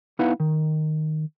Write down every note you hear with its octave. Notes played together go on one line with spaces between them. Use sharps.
B3 D#4 E4 B4 F5 F#5
D#3